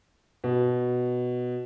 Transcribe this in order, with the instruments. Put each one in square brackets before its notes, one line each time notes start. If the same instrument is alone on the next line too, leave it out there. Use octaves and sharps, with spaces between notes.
[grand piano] B2